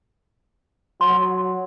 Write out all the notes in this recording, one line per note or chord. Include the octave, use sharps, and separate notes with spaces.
F#3 C6